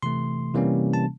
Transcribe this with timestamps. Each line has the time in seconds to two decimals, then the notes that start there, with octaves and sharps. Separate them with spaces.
0.02 C3 E3 A3 C6
0.54 C3 E3 G3 A#3 C#4
0.93 A5